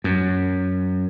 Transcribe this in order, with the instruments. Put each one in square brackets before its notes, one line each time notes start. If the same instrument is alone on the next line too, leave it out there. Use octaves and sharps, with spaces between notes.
[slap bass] F#2